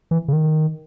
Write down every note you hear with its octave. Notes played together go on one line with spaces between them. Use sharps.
E3
C#3
D#3